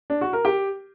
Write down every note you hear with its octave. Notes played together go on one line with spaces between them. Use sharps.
D4
F#4
A#4
G4